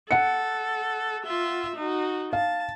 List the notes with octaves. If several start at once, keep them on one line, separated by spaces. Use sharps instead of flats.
A4 F#5 C#7
F4 E5
D#4 F#4
F5 A5